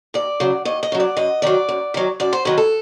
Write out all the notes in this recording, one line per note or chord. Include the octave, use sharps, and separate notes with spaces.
D#2 D5
C#3 F#3
D#2 D#5
D#5
C#3 F#3
D5
F#2 D#5
D#3 F#3 D5
F#2
D#3 F#3
F#2 D5
C5
D#3 F#3 B4
A4